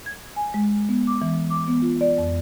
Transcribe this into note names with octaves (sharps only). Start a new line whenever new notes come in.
G#6
G#5
G#3
B3
D6
E3
D6
B3
F4
D5
F2